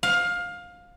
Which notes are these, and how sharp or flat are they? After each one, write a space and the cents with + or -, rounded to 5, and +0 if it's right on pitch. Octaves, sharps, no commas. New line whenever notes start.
F5 +20